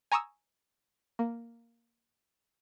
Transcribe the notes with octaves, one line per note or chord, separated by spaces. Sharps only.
G#5 A#5 C#6 D#6 E6
A#3